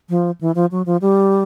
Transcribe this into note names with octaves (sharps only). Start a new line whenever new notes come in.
F3
E3
F3
F#3
F3
G3